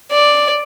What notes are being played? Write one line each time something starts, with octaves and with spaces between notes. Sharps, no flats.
D5